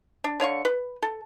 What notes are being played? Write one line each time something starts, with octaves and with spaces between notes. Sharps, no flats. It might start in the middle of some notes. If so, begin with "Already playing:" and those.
D4
D3 C#5 F5 C#6
B4
A4